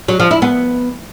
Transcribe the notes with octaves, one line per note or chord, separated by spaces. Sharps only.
F#3
F3
E4
B3